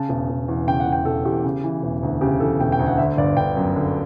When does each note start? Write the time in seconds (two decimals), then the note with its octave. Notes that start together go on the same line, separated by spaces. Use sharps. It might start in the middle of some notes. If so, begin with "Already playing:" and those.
Already playing: C#3 A5
0.09 E1
0.30 E1
0.49 E2
0.67 C#3 G5
0.80 F#5
0.87 E1
0.92 G5
1.05 E1 A4
1.25 E2 G4
1.44 C#3
1.64 E3
1.82 E1
2.03 D2
2.21 C#3 G4
2.40 E3 A4
2.60 E1 G5
2.72 G5
2.79 D2
2.86 F#5
2.98 D3 E5
3.17 G1 D5
3.36 G1 G5
3.57 F#2
3.76 D3